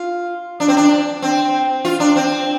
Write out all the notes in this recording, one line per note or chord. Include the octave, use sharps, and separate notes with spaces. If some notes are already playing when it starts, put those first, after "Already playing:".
Already playing: F4
D4
C4
D4
C4
F4
D4
C4